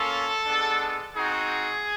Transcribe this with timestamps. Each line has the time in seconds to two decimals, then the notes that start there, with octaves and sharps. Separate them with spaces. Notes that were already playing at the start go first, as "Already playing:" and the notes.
Already playing: A#3 C#4 F4 A4
0.45 G#3 B3 D4
1.16 C4 D#4 F#4 G#4